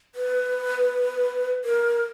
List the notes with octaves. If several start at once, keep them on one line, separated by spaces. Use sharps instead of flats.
B4
A#4